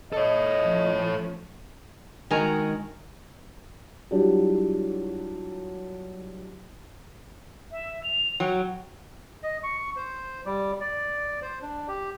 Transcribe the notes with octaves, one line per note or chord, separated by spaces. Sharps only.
A4 C#5 D#5
F3 A3 C#4
D#3 G#3 F#4 A#4 G#5 A#5
F#3 G3 D4 E4 F4 G4
E5
F7
F#3 G5
D#5
C#6
C5
G3
D5
C5
D4
G4